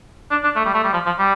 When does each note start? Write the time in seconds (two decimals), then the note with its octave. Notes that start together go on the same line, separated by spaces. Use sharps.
0.31 D4
0.44 D4
0.56 A3
0.65 G3
0.74 A3
0.84 G3
0.93 F3
1.06 F3
1.19 G3